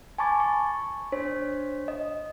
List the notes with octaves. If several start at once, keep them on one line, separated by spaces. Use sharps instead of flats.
G#5 A5 B5 C#6 D6 A6
C#6
D4 C5 C#5 B6
D#5